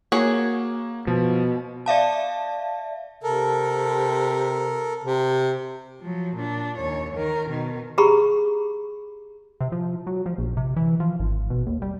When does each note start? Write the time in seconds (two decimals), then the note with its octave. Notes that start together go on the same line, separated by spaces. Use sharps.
0.12 A#3 F#4 G#4 C#5
1.07 B2 F3
1.86 D5 E5 F5 A5
3.23 C3 A4 A#4
5.04 C3
6.01 F3 F#3
6.36 A#2 D4
6.77 D#2 C#5
7.14 D#3 A#4
7.49 B2 D#3
7.98 G4 G#4 A#5 B5 C#6
9.61 C3
9.72 F3
10.07 F#3
10.26 F3
10.38 A#1
10.57 C3
10.76 E3
11.00 F3
11.19 G#1
11.50 B2
11.67 D#2
11.82 G3